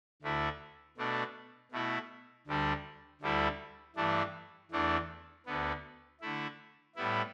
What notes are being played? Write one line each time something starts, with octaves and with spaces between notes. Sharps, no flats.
D2 D3 A3 E4
B2 A3 D4
B2 A3 E4
D2 D3 G3 D4
D2 D3 G3 E4
G2 E3 A3 D4
E2 E3 A3 D4
D2 D3 B3
D3 A3 E4
A2 G3 B3 E4